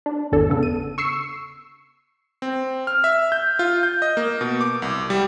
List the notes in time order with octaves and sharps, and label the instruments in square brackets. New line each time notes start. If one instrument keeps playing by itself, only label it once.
[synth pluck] D4
G#1 E2 D4 A4
C#3 B3 A4
D#7
C#6 E6 C7 C#7
[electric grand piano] C4
F6
E5
G6
F4
G6
D#5
A#3
B2
D6
C2
G3